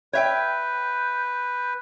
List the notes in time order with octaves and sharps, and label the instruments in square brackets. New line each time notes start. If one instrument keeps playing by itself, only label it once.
[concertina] B4 [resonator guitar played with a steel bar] C#5 E5 G5 [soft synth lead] G6